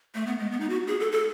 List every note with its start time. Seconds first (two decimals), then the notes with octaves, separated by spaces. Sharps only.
0.15 A3
0.27 B3
0.39 G#3
0.51 B3
0.60 D#4
0.70 F#4
0.87 G#4
1.00 A4
1.12 A4